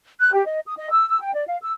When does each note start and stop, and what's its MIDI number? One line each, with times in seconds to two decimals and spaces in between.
0.20 0.33 90
0.34 0.44 67
0.46 0.60 75
0.66 0.74 87
0.78 0.90 75
0.91 1.07 88
1.08 1.18 88
1.21 1.35 79
1.35 1.45 74
1.47 1.57 77
1.62 1.71 88